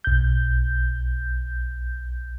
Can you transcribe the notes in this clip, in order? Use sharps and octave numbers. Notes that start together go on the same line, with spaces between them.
B1 G6